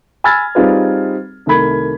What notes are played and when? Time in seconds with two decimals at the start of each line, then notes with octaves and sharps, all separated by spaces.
0.24 G#5 B5 E6 F6 G#6 A6
0.55 G3 C4 D#4 F4 G#4 B4
1.46 C2 D#3 A3 A#4 B5 G#6